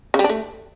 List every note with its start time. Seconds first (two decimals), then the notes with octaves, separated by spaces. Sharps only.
0.14 C#3
0.19 G3
0.24 D4
0.30 A3